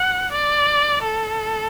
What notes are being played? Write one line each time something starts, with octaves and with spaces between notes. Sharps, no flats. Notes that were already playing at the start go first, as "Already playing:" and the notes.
Already playing: F#5
D5
A4